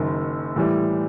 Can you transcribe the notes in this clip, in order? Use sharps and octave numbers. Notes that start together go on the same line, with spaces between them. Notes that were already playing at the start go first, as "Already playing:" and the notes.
Already playing: F#1 F#2 D#3
A2 E3 G3